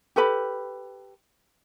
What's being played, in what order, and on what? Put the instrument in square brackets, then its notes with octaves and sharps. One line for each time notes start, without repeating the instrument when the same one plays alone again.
[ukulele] G4 A4 B4 B5